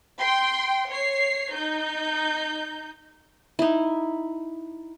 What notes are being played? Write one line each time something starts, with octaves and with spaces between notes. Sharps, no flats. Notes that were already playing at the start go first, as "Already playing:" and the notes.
G5 C6
C#5 C7
D#4 G6
D#4 E4